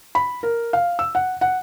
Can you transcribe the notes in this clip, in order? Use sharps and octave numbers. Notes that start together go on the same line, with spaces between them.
B5
A#4
F5
E6
F#5
F#5